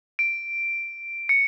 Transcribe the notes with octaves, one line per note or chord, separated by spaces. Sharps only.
D7
C#7